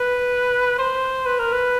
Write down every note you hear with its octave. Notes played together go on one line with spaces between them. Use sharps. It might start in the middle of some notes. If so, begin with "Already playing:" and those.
Already playing: B4
C5
B4
A#4
B4